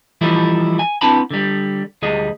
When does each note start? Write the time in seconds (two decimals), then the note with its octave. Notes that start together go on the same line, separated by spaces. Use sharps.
0.21 E3 F3 G3 A3 D#4 E4
0.79 G#5
1.01 B3 C4 D4 E4 A5 B5
1.31 D3 G3
2.02 D2 G3 G#4 D#5